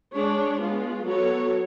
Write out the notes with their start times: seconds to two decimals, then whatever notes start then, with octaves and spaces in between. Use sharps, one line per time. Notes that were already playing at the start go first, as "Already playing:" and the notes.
0.13 G#3 D4 G#4 C#5
0.60 G#3 B3 F4 G#4
1.05 F#3 B3 F#4 A4 C#5